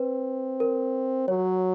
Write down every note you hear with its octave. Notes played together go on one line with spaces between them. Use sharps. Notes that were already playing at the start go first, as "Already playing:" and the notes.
Already playing: C4 B4
A#4
F#3 C#5